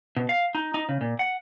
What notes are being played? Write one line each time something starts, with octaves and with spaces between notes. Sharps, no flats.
B2
F5
D#4
D#4
C#3
A#2
F#5